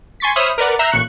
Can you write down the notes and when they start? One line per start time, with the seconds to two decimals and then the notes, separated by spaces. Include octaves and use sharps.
0.20 G#5 C6 C#6 A6 B6
0.36 C5 C#5 E5 B5 D#6 F6
0.58 A#4 B4 D5 F#5
0.79 E5 A#5 E6 F#6 G6 C7
0.92 A1 A#2 C#6 F#6 C#7